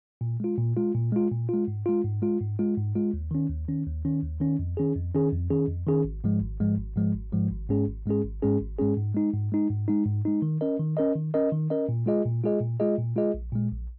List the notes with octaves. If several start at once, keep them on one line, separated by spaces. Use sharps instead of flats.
A#2
G#3 F4
A#2
G#3 F4
A#2
G#3 F4
A#2
G#3 F4
G#2
G#3 F4
G#2
G#3 F4
G#2
G#3 F4
G#2
G#3 F4
D#2
D#3 C#4
D#2
D#3 C#4
D#2
D#3 C#4
D#2
D#3 C#4
F2
D#3 C#4 G#4
F2
D#3 C#4 G#4
F2
D#3 C#4 G#4
F2
D#3 C#4 G#4
G#1
G#2 F3 G#3
G#1
G#2 F3 G#3
G#1
G#2 F3 G#3
G#1
G#2 F3 G#3
G#1
G#2 G#3 C#4 G#4
G#1
G#2 G#3 C#4 G#4
G#1
G#2 G#3 C#4 G#4
G#1
G#2 G#3 C#4 G#4
G#2
G#3 D#4
G#2
G#3 D#4
G#2
G#3 D#4
G#2
G#3 D#4
D#3
C#4 A#4 D#5
D#3
C#4 A#4 D#5
D#3
C#4 A#4 D#5
D#3
C#4 A#4 D#5
A#2
G#3 F4 G#4 D#5
A#2
G#3 F4 G#4 D#5
A#2
G#3 F4 G#4 D#5
A#2
G#3 F4 G#4 D#5
A#1
A#2 G#3
A#1